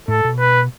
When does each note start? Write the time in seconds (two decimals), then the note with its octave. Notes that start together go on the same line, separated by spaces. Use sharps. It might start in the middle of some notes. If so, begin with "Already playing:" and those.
0.08 A2 A4
0.24 B2
0.39 B4